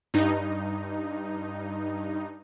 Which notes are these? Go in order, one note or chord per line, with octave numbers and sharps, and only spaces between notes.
G2 D#4